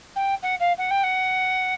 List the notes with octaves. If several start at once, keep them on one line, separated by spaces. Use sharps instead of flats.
G5
F#5
F5
F#5
G5
F#5